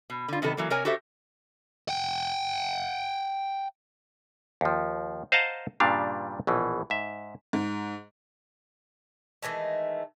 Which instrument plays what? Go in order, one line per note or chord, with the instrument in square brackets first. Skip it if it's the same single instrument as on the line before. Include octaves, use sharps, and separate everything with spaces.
[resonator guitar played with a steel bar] B2
D3 F4
C3 D#3 F#3 B3 A4
E3 F#3 A#3
C3 A#4 C#5 G#5
F#4 G4 A4 C5 E5
[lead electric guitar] F#5 G5
[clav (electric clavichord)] D#2 F3
C5 D#5 F5 F#5 A5 A#5
G2 A#2 C#3 G3 D4 F5
A#1 B2 E3
G#2 E5
[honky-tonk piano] G#2
[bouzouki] D#3 E3 G#3 A3